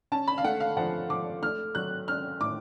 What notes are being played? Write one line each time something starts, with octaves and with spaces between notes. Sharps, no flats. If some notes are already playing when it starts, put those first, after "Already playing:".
C#4 A5
B5
F5
A3 F#5
F5
F3 F#5
F3 D6
A3 F6
F#3 F#6
C#4 F6
A2 D6